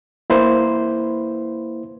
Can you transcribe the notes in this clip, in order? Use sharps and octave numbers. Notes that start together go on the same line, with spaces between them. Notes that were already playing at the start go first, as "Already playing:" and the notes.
A#3 E4 B4 C5